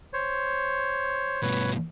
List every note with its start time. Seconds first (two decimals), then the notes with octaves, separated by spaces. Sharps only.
0.13 C5 C#5
1.42 G2 B2 B4 C#5